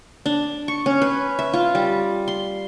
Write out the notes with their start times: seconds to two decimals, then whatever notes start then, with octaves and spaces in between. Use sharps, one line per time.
0.26 D4
0.68 C#6
0.86 C#4
1.02 B4
1.39 E5
1.53 F4
1.75 G3
2.28 C6